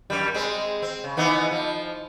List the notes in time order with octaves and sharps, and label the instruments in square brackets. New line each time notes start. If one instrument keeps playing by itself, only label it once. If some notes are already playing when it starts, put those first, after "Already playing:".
[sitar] F#2 G3
G#3 C4
C4
C#3
E3 B3 D#4
F3